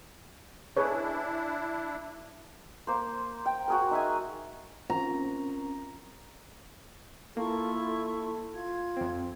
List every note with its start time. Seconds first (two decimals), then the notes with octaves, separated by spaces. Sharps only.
0.77 D4 E4 G#4 B4 C#5
2.87 A#3 C5
3.46 G5
3.68 F#4 G#4 A#4
3.91 D#4 E5 G#5
4.90 C4 C#4 A#4 A#5
7.37 A#3 E4 F4 A4 C#6
7.85 A4
8.54 F4 G#6
8.97 F2 C4